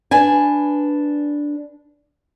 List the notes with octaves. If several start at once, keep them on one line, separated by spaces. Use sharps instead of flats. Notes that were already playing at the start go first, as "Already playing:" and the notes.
D4 B4 G#5